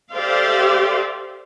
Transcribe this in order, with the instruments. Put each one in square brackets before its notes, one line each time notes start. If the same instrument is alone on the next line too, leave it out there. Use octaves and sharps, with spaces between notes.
[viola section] G4 A4 C5 D5 E5 F5